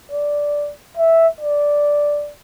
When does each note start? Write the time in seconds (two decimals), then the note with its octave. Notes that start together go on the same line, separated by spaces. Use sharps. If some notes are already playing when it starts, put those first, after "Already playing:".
0.11 D5
0.97 E5
1.41 D5